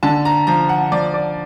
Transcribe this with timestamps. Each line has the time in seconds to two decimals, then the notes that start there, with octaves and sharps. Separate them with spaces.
0.03 D3 A5
0.25 A#5
0.47 F3 A#5
0.69 F#5
0.92 F3 D5
1.14 D5